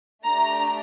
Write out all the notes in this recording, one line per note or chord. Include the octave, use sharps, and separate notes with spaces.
A3 D4 G4 A#5